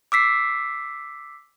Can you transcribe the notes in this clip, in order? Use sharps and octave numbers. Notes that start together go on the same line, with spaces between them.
D6 E6 B6 C7